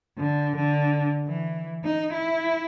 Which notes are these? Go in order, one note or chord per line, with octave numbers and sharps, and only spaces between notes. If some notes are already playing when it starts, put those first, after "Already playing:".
D3
D3
E3
D#4
E4